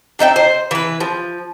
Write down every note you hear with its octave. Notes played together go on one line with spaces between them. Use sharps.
D4 D#4 E5 G5
C5
E3 B4
F3